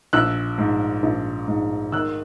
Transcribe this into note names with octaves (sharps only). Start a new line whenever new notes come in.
A#1 E6 F#6
G#2
A#1
G#2
D#3 E6 F#6